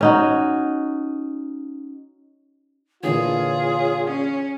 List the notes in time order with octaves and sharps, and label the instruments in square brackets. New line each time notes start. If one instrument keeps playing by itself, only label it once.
[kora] C#4 D#4 F#4
[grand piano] A#2 D3 E3 [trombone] F4 [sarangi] G#4 [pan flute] C#5
[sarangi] C#4